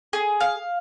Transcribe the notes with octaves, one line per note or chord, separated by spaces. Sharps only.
G#4
F5